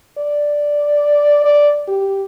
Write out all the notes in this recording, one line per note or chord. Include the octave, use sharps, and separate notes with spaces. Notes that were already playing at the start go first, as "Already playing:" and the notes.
D5
D5
G4